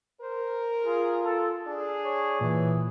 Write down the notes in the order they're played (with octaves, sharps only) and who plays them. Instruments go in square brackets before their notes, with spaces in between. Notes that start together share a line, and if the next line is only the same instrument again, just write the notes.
[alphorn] A#4 [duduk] C5
[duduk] F4 [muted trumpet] G#4
[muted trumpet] A4
[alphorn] D4 [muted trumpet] G#4
[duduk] C#5
[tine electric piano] A#2 [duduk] E3